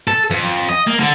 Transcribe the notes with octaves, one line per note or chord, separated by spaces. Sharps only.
A4
F2
D#5
A#3
D3